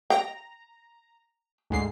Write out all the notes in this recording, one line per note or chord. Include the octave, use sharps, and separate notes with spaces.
G5 A#5
D2 G#2 C7